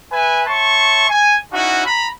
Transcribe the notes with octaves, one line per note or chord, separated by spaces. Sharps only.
B4 E5 G#5
C#5 E5 A5 C6 C#6
G#5
C#4 D#4 E4 F#4
A#5 B5